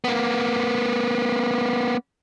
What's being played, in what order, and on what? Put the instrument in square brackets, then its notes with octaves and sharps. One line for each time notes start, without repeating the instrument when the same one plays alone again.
[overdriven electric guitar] A#3 B3